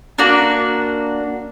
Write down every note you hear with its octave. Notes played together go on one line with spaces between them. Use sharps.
A#3 D4 F#4